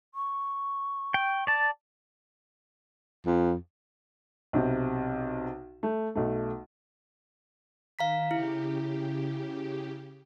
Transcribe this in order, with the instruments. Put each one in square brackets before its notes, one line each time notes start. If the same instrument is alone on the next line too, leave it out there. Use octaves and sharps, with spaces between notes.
[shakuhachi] C#6
[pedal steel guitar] G5
D5 A5
[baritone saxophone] F2
[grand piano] B1 C3
A3
B1 A3
[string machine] D#3 [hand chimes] F5 A#5 B6
[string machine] C#3 G4 [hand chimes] E4